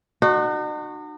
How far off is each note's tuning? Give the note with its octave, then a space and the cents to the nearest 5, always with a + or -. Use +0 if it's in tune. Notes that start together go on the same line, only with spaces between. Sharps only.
D#4 -45 F#4 +0